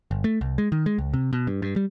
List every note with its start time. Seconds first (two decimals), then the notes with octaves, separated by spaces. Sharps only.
0.11 G1
0.24 A3
0.41 C2
0.58 G#3
0.72 D#3
0.86 G#3
0.98 C#2
1.14 C3
1.33 B2
1.47 G2
1.62 G2
1.76 G3